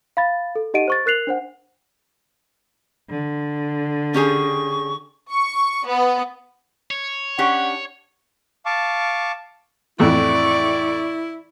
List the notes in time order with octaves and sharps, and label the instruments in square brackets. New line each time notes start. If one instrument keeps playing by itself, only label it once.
[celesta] F5 B5 A6
A4
D#4 G4 D#5 F#5 D7 D#7
C5 C#6 A6
A#4 F#6 C7 F7 F#7
D4 C5 F#5
[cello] D3
[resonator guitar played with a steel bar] C#4 G4 G#4 [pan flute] C#6
[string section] C#6
B3
[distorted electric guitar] C#5
[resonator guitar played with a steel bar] C#4 D4 G4 [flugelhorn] F#5
[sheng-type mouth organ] F5 A5 C#6 D6
[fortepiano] F2 A2 E3 [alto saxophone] E4 [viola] D5 C#6